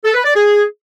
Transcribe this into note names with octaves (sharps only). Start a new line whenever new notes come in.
A4
B4
D5
G#4